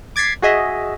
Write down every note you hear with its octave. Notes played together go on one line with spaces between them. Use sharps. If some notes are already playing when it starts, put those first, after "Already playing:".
D6 G#6 A6 B6 C7
F#4 G#4 D#5 E5